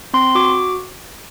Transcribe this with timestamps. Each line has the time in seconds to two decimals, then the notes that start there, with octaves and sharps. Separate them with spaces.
0.14 C4 C6
0.35 F#4 D6